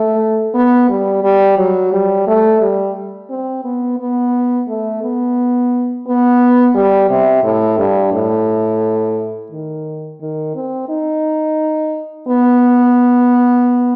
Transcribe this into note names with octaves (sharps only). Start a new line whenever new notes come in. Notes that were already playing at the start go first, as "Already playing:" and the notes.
Already playing: A3
B3
G3
G3
F#3
G3
A3
G3
C4
B3
B3
A3
B3
B3
G3
C3
A2
G2
A2
D#3
D#3
C4
D#4
B3